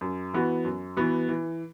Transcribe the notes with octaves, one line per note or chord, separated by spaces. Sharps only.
F#2
E3 B3 F#4
F#2
E3 B3 F#4
E3